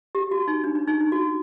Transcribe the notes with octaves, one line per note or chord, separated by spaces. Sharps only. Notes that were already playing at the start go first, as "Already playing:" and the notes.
G4
F#4
D#4
D4
D4
D#4
D#4
F#4